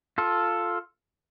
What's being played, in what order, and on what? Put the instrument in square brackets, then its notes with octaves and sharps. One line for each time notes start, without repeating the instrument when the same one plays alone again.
[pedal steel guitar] F4 A4